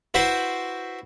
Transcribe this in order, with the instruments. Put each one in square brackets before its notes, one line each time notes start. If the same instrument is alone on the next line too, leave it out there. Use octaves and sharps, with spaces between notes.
[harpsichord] E4 F#4 B4 C5